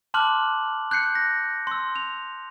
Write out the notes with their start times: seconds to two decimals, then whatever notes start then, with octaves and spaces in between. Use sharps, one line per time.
0.14 A5 C6 D6 F6 F#6 F#7
0.91 F#6 G6 C7 C#7
1.15 A#6
1.67 C6 E6
1.96 F7